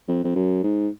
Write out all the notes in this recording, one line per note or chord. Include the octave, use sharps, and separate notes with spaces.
F2
F2
F#2
G#2